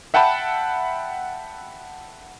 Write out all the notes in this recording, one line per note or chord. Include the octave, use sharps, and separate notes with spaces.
E5 F#5 G5 A5 B5